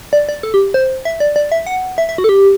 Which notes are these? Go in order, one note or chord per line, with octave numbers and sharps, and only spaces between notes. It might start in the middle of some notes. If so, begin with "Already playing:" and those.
D5
D5
A4
G4
C5
E5
D5
D5
E5
F#5
E5
E5
F#4
A4
G4